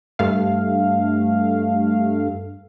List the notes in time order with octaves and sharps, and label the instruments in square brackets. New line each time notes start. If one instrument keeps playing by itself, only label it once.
[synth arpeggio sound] G2 A3 F5